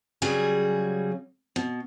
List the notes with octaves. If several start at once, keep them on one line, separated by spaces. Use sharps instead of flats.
C#3 F#3 G3 G#4
B2